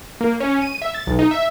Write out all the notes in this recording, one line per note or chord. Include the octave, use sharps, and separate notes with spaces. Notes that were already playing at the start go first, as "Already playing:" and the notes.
A#3
C#4
D#7
E5
A6
B1
D#4
E5